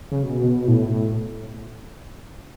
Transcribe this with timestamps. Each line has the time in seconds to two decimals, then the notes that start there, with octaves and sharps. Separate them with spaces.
0.12 C#3
0.23 B2
0.68 A2